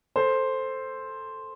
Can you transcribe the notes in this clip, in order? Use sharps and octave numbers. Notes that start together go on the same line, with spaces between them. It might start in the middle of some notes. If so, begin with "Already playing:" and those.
A4 C5